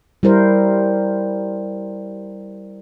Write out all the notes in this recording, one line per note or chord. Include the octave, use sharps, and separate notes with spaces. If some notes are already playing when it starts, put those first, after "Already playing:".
G3 E4 A#4 C5